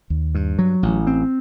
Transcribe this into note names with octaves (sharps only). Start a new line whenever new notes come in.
D#2
G2
F#3
A1
C4